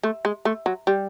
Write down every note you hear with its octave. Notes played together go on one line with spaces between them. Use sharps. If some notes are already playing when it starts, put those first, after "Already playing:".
A3
G#3
A3
F#3
G3